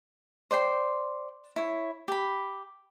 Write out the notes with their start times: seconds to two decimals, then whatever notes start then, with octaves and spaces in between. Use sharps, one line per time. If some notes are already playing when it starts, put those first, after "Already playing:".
0.51 C5 D5 G5 C6
1.56 E4 C#5
2.08 G4 B5